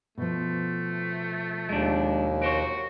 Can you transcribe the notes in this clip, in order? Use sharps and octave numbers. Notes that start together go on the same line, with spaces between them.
B2 F3 A3
D#2 G#3 D4
F#4 A#4 C5 C#5